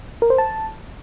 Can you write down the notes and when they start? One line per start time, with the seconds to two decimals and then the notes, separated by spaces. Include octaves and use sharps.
0.22 A#4
0.30 C5
0.38 A5